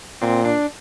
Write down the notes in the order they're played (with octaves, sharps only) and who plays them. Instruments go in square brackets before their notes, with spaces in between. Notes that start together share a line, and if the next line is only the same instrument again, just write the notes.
[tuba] A#2 [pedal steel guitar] C4
[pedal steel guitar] D4